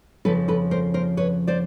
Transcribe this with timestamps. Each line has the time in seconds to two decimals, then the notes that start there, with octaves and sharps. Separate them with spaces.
0.25 F2 C#3 F3 A4 B4
0.48 A4 B4
0.71 A#4 C5
0.94 A#4 C5
1.17 B4 C#5
1.47 C5 D5